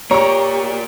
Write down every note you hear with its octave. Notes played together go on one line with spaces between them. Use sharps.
A#3 G4 C#5 D5 A#5 C#6